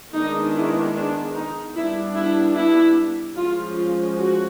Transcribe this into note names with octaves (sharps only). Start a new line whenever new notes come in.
D#3 G#3 B3 D4 D#4
E4
D4
D#4
G3 B3 D4 E4
E4
E4
F3 G#3 C#4 F4
F4
F#4